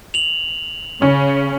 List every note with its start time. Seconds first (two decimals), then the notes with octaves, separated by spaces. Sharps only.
0.14 F7 F#7
1.02 C#3 C#4